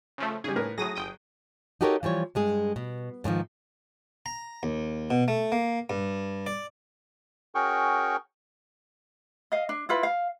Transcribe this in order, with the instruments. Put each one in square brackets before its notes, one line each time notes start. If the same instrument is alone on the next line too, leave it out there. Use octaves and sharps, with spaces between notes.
[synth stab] C#3 F3 A3
[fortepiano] C#3 G3 [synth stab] G#4
[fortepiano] A2 A#4 B4
[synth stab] A2 D#6 A#6 [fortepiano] F#3 G#4
[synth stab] G1 G5 D#6
[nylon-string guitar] D#4 F#4 G4 A4 A#4 C#5
E3 F3 G3 C#5
G2 G#3 G#4
B2
G#2 D3 D#3 F3
[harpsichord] A#5
D#2
B2
A3
A#3
G2
D5
[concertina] C#4 F#4 G#4 A#4 G5 C#6
[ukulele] D#5 F5
D4
E4 F4 B4
F5